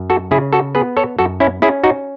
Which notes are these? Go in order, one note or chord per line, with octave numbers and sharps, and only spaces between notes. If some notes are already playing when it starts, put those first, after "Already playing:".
Already playing: F#2
F#4 A4
C#3 E4 G#4
F#4 A4
B3 G#4 B4
A4 C#5
F#2 F#4 A4
C#4 E4
C#4 E4 G#4
D#4 F#4